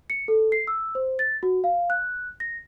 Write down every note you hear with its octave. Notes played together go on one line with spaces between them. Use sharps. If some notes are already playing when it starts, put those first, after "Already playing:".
C#7
A4
C7
E6
C5
A6
F#4
F5
F#6
A#6